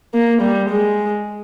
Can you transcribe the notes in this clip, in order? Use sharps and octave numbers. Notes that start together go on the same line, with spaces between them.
A#3
G3
G#3